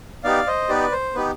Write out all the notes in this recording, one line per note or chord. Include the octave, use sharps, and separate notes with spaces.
B3 D#4 G4 D5 F5
C5 D#5
B3 D#4 G4 B4 D5
C5
B3 D#4 G4 B4